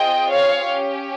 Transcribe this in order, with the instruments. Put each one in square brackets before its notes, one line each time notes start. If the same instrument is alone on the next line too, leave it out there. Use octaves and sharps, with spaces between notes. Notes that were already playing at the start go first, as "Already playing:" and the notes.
Already playing: [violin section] C4 F4 G#4 D#5 G5
C#5 F5
C#4 G4